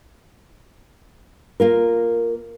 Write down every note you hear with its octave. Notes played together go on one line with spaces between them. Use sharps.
A#3 F4 A#4